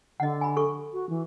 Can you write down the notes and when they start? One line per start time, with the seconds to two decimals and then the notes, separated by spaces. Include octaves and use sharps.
0.20 D3 D#5 F#5
0.41 G#5 B5
0.57 A4 C#6
0.93 F#4
1.09 E3